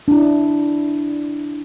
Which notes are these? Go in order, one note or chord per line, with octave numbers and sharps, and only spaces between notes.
D4 E4